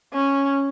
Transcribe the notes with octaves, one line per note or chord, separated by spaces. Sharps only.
C#4